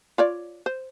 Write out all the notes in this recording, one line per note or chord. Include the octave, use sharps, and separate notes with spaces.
F4 C#5 D5
C5